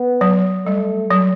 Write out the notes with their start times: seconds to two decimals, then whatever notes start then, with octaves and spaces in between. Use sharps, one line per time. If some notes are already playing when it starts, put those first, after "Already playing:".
Already playing: B3
0.21 F#3
0.66 G3 A3
1.11 F#3